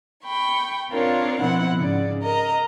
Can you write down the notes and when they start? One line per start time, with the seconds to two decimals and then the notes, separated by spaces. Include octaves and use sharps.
0.24 G5 B5 C#6
0.90 C4 D4 F4 A#4 C#5
1.40 B2 F3 C4 E4 F#5
1.76 G#2 C#3 D5
2.21 A#4 D#5 A#5